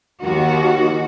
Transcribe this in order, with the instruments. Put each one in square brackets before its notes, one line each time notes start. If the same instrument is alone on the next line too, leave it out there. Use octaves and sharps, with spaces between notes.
[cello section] D#2 D#3 F#4